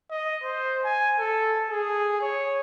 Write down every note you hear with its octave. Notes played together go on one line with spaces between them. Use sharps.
D#5
C5
G#5
A4
G#4
C#5